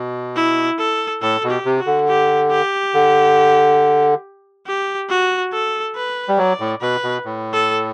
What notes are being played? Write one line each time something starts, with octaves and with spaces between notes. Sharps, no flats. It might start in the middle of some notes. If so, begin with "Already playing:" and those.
Already playing: B2
E4
A4
A2 A4
B2
G4
C3
F#4
D3
G4
G4
D3
G4
F#4
A4
B4
G3
F#3 D5
A2
B2 B4
B2
A2
A4